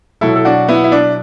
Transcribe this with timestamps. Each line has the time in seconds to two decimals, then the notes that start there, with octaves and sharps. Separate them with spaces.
0.21 B2 F#3 E4 A4
0.35 A4
0.45 D4 F#4
0.68 B3 E4
0.84 E4
0.92 D4